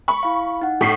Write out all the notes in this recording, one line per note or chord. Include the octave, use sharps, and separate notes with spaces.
B5 C#6
E4 F5
D#4 F#5
A2 B6 C7